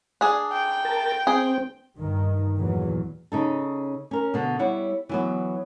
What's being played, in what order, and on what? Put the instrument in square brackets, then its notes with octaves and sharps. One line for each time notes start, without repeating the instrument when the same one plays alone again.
[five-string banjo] D4 G#4
[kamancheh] G5
[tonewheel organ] A#4 A5
[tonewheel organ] C4 [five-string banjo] G#4
[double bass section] G2 D#3
E2 A#2 E3 F#3
[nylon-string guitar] C#3 D#4 A4
C#4 A#4
B2 D3
G3 E4 C#5 F#5
E3 F#3 B3